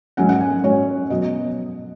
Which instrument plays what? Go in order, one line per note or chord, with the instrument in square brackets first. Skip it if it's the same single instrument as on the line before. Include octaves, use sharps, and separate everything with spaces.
[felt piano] G#2 F#3 C#4 F#5
F#5
G#5
G#2 F#3 C#4 C#5
B2 F#3 B3 D#5